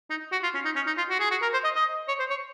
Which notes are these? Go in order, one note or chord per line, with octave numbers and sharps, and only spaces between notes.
D#4
F#4
F4
C#4
D#4
C#4
D#4
F4
F#4
G#4
F#4
A#4
C5
D#5
D#5
C#5
C5
C#5